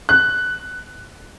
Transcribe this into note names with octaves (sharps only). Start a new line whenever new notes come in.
F#6